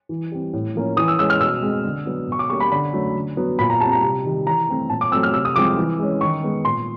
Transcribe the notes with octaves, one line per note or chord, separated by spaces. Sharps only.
E3
G3 C4
A2
F3 A#3 C#4
E3 D#6
E6
G#3 C#4 E6
F6
B2 E6
G#3 C4
D3
F#3 B3
B2 C#6
D6
G3 A#3 C#4 C#6
B5
D3 B5
F#3 A3 C#4
D3
F#3 B3
A#2 B5
A#5
G3 C4 A5
A#5
C3
D#3 G3
E3 A#5
A3 C4
A#2 A5
D6
F#3 A3 C4 E6
F6
C3 E6
D#6
F3 G#3 C4 D6
E3
G#3 C#4
D#3 C#6
G#3 B3
A#2 C6